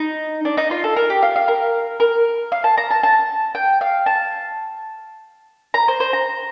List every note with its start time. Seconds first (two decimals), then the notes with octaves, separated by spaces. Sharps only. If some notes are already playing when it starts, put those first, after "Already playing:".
Already playing: D#4
0.45 D4
0.57 D#4
0.71 F4
0.84 A4
0.96 A#4
1.10 G4
1.22 F5
1.36 F5
1.48 A#4
2.00 A#4
2.52 F5
2.64 A5
2.78 A#5
2.91 A5
3.03 A5
3.55 G5
3.81 F5
4.06 A5
5.74 A#5
5.88 C5
6.00 C5
6.13 A#5